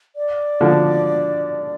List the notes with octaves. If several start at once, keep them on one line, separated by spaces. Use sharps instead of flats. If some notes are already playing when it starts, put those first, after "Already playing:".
D5
D3 F3